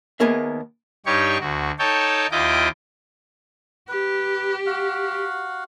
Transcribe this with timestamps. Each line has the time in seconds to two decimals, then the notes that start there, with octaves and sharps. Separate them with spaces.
0.20 D#2 A#3 B3 G#4 A#4 E5
1.06 G2 G3 D#4 G4 C#5 C#6
1.40 D2 F#4
1.79 D#4 A4 C#5 G5 A5
2.31 D#2 E4 F4 D#5 G5 D6
3.89 G4 B4
4.66 F#4 F5 F#5